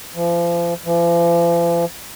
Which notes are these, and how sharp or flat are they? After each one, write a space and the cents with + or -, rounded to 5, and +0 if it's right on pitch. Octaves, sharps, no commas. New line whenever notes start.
F3 -35
F3 -45